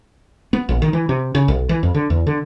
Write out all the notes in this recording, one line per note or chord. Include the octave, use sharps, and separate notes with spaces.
B3
A#1
D#3
E3
C3
C#3
B1
E3
F2
D3
E2
D3